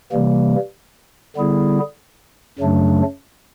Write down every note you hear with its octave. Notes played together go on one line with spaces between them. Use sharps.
C3 E3 G3 A#3
D3 G3 B3 E4 G#4
F#2 C#3 F#3 A3 D4